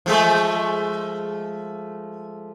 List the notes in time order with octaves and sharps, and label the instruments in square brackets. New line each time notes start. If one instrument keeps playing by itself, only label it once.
[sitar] F3 G#3 A3